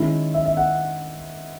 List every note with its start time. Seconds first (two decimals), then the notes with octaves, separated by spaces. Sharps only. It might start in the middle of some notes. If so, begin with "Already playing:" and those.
Already playing: D#3 G#3 C#4 E4
0.34 E5
0.46 E5
0.57 F#5